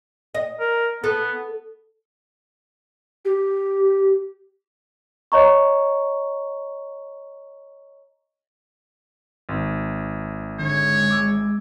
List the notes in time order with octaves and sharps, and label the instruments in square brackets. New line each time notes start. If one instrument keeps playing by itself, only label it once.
[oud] D#5
[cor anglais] A#4
[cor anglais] B3 [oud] A4
[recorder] G4
[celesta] C#5 D#5 A#5 C#6
[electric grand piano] G#1
[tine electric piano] D3 [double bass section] G#3 [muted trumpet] C#5
[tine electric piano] D6 E6 G#6